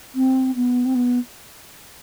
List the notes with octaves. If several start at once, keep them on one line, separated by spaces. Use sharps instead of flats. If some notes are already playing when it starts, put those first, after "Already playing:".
C4
B3
C4
B3